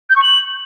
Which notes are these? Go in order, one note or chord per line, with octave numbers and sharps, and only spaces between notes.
G6
C#6
F#7